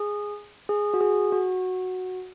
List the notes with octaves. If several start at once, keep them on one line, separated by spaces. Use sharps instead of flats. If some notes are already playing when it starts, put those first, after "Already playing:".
Already playing: G#4
G#4
F#4
G#4
F#4